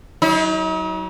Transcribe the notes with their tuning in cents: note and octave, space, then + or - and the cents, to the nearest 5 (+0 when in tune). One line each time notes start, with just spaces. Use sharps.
F#3 +20 D#4 +45